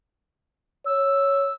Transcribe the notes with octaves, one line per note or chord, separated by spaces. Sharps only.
C#5 E6